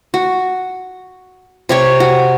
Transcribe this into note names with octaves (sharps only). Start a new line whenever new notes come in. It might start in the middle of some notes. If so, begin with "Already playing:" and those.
F#4
C3 G4 C#5
F#4